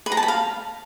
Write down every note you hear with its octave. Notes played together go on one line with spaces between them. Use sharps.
B4
A#5
A5
B5
F5